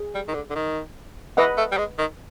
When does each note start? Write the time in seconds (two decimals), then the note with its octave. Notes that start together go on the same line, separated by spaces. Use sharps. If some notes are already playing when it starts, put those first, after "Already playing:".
Already playing: G#4
0.14 G3
0.28 D#3
0.34 D3
0.50 D3
0.55 D#3
1.37 E3 B4 D#5 F#5
1.57 A3
1.72 G3
1.78 G#3
1.98 D#3